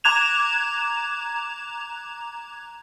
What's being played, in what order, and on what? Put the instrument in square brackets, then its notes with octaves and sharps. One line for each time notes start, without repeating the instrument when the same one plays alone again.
[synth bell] A#5 D6 F#6 G#6 E7 F7